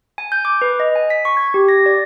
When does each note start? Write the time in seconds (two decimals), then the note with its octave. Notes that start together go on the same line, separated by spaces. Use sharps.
0.18 G#5
0.32 G6
0.45 D6
0.62 B4
0.80 D#5
0.96 G#5
1.10 B6
1.25 C#6
1.37 G#6
1.54 G4
1.69 A#6
1.86 D5